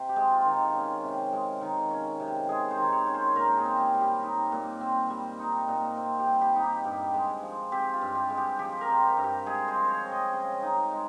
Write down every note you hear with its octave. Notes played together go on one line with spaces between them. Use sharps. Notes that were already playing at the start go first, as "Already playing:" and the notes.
Already playing: C3
G4
G#3
F4
D#3
C#4
C3
G#3
D#3
C#4
C3
G#3 G#4
C5
D#3
C#5
C#4
C5
A#2 A#4
G#4
C4
G4
G3
G4
D#4
A#2
C4
G3
D#4
A#2
C4
G4
G3
G4
D#4
G4
G2 G4
G#3
F3
C4 G4
F4
G2
G4
G#3
G4
F3 G4
A#4
C4
G4
G2
G4
G#3 G#4
C5
F3
C5 C#5
C4
D#5
C#3
D#4
G#3